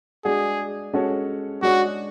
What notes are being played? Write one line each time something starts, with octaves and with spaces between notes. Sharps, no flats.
G#3 D4 F#4 G#4
G#3 C#4 F#4 A4 C#5
G#3 D4 F#4 G#4 C#5